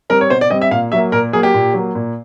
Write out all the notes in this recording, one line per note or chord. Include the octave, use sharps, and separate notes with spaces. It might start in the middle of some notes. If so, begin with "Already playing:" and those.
G3 C4 A#4
C#5
B2 C5
D5
G3 C4 D#5
E5
A#2 F5
F#3 A#3 E5
A#2 A#4
F#3 A#3 G#4
G4
A#2
F#3 A#3
A#2